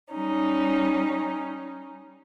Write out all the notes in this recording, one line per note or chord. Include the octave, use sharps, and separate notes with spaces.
G3 C#4 D#4